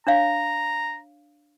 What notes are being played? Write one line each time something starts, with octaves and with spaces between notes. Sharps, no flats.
D4 C#5 F5 A#5